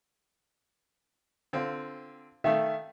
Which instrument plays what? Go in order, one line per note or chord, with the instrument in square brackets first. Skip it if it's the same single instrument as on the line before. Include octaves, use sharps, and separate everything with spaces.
[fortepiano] D3 C4 F4
[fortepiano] D#3 A3 [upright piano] E5 F5